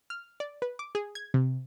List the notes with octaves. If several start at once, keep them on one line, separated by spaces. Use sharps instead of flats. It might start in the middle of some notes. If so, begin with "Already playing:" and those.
F6
D5
B4
D6
G#4
G#6
C3